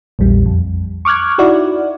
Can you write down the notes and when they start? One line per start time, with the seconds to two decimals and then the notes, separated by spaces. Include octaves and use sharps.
0.19 A#1 E2 G3
0.46 F2
1.05 C#6 D6 F6 F#6 G#6
1.38 D#4 E4 F#4 D5